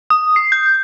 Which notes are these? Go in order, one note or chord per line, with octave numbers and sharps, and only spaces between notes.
D#6
C7
G6